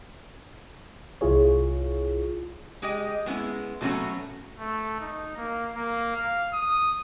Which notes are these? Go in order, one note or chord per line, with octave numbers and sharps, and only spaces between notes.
C2 E4 F4 G#4 C#5
G#3 G4 D#5
G#3 B3 C#4 E4
B2 F#3 A3 A#3 C#4 F#4
A3
D#4
A#3
A#3
F5
D#6